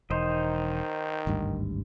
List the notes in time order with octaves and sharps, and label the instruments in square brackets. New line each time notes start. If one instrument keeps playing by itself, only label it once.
[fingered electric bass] E1 [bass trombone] D#3 [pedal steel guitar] D#4 C5 D#5
[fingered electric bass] G#1 D2 G2